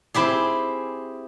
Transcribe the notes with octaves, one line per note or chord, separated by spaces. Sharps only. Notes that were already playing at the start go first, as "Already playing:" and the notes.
C4 E4 G4 G#4